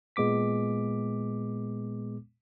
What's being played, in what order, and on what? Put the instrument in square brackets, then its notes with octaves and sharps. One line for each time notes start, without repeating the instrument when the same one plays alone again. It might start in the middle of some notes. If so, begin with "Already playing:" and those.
[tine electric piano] A#2 G#3 B3 D6 B6